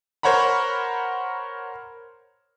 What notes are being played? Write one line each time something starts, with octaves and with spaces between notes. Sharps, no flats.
A#4 C5 C#5 F#5 A#5 B5